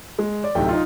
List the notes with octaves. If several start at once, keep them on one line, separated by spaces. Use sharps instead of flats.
G#3
D5
D1 C3 A3 D#4 G5
D#4 F4